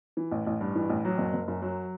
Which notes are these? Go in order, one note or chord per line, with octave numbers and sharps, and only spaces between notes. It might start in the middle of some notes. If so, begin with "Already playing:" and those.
E3
A1
A1
G2
E3
A1
F#3
F#1
F#1
F#2
F#3